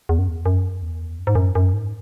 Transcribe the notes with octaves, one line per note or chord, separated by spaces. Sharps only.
E2
F#2
E2
F#2
E2
F#2
G#2
F#2
F#2
G#2